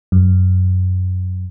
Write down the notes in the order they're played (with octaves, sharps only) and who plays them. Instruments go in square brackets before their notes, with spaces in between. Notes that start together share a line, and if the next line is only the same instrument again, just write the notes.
[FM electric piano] F#2